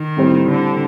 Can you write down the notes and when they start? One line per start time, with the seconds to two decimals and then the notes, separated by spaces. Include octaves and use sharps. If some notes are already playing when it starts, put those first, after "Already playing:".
Already playing: D#3
0.17 A2 G3 C4
0.48 D3